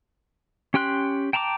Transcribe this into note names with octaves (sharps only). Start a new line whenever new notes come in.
C#4 G4 G5 C6 F#6
G5 A5 A#5 C6 D6